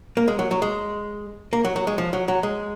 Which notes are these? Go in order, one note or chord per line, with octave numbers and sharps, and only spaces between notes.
A#3
G#3
F#3
F#3
G#3
A#3
F#3
F#3
G#3
F3
F#3
F#3
G#3